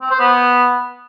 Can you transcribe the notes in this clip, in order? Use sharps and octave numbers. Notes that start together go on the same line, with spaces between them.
C4
C5
B3